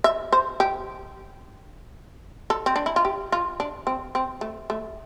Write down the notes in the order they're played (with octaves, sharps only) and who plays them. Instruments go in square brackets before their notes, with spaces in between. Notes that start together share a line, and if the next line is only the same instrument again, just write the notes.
[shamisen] E5
C5
G4
A4
C4
D4
E4
F4
G4
F4
D4
C4
C4
A3
A3